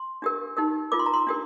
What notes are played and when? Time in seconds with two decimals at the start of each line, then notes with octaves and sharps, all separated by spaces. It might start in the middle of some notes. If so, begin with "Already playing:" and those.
Already playing: C6
0.22 D4 G4 A#4
0.57 D#4 G4 A#4
0.92 F4 A#4 D6
0.99 C6
1.06 A#5
1.14 C6
1.27 D4 G4 A#4